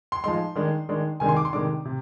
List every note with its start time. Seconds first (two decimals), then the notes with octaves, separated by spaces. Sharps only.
0.12 C6
0.24 F3 G#3 D#4 C6
0.56 D#3 G#3 D4
0.89 D#3 G#3 D4
1.20 C3 D#3 G#3 D4 G#5
1.29 C6
1.37 D6
1.45 C6
1.53 C3 D#3 G#3 D4 D6
1.85 C3